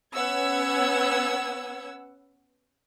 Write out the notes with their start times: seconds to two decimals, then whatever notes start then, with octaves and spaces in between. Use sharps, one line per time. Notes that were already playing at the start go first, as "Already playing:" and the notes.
0.14 B3 C#4 F#5 E6 G#6